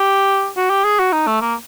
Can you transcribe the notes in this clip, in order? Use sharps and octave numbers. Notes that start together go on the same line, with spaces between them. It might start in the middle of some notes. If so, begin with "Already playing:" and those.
Already playing: G4
F#4
G4
G#4
F#4
D#4
A3
A#3